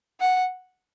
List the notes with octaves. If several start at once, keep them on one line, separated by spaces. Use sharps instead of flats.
F#5